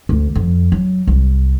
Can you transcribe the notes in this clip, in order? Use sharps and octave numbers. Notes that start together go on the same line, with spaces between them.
D2
F2
F#3
C2